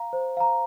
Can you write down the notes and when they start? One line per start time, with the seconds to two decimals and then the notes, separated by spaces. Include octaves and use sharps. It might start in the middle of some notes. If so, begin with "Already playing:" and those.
Already playing: F5 A#5
0.13 C5
0.37 F5 A#5